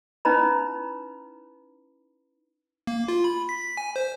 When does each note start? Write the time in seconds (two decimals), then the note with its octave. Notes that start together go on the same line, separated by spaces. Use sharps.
0.25 C#4 D#4 E4 B4 A#5 B5
2.87 A#3
3.08 F4
3.24 B5
3.49 B6
3.77 G#5
3.96 C5